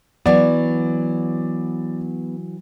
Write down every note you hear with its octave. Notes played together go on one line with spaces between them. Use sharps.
E3 F#3 B3 D5